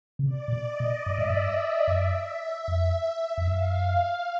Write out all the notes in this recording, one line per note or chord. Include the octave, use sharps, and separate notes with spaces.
C#3
C3 D5
A#2
B2
D#5
B2
G2 E5
G#2
G2
F#2
F2 E5
F2
F#2 F5